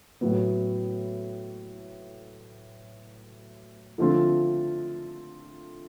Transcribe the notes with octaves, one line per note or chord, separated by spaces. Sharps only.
A2 F#3 B3
D3 F3 A3 C4 F4